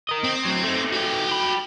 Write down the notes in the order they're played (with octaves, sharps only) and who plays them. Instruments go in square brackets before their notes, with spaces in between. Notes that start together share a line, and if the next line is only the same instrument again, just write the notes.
[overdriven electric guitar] A#4 D#5
[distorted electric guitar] C4
[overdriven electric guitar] D2 F#3
A3 D#4
[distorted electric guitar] F#4 G5
[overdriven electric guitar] G4 B5